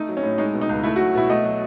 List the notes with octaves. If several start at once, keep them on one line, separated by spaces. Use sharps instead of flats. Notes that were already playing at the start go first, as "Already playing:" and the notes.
Already playing: A3 D#4
F#3
C#4
A2
G#3 D#4
B2
D#4
C#2
A3 E4
F#3 F#4
B2 E4
A3 D#5
F#3